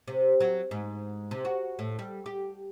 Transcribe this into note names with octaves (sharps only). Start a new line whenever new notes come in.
C3
F#3
G#2
C3
F#4
A2
G3
G4